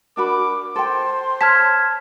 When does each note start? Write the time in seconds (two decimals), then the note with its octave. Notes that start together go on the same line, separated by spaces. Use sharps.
0.17 D4 F#4 A#4 B5 D6
0.76 A4 C5 G5 C6
1.41 C#5 A5 F6 G#6 B6